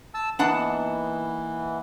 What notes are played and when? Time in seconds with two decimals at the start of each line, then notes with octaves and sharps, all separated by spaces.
0.14 A5 E6
0.39 E3 A#3 B3 D4 D#4 F#5 A5